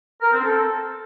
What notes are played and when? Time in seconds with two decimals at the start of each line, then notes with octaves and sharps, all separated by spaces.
0.21 A#4
0.32 C4
0.43 A4